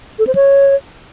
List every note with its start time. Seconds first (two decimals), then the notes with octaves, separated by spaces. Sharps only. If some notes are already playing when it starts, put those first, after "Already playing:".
0.19 A4
0.27 C5
0.35 C#5